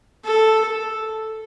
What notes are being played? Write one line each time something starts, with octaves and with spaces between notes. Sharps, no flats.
A4